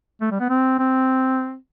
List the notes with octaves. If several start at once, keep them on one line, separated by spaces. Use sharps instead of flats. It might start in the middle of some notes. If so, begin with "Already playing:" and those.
A3
G3
B3
C4
C4